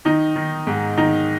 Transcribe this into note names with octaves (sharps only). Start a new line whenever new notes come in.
D#3 D#4
D#3
G#2
D#3 D#4